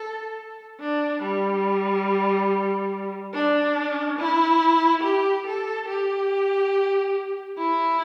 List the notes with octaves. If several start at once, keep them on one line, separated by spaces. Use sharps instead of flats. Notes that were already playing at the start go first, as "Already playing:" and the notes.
Already playing: A4
D4
G3
D4
E4
G4
A4
G4
E4